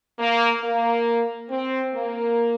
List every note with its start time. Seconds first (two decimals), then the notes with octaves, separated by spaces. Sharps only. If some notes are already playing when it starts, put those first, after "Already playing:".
0.19 A#3
0.62 A#3
1.49 C4
1.93 A#3